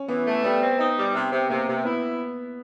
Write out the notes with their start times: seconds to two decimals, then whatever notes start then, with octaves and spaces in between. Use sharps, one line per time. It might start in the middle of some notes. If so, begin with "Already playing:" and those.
Already playing: C#4
0.08 E3 B3
0.26 A3
0.43 G3 B3
0.61 C4
0.79 D#4
0.96 G3
1.15 C3
1.32 C3
1.49 C3 A#3
1.67 C3
1.85 B3 E4